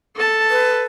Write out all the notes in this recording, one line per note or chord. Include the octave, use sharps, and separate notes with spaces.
A4 A5
B4